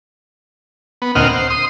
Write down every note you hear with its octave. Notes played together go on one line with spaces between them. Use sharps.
B3
D2 A#2 C4 D#5 F#5 F6
C5
C6 D#6